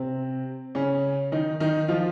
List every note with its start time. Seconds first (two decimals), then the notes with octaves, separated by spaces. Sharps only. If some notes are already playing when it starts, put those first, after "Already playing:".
Already playing: C3 C4
0.75 C#3 C#4
1.32 D#3 D#4
1.60 D#3 D#4
1.88 F3 F4